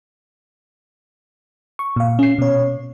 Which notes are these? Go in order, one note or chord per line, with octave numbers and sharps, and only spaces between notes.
C#6
A#2 F5
C#4 C7
B2 C#5